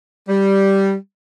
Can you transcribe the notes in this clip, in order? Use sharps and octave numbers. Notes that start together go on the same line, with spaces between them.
G3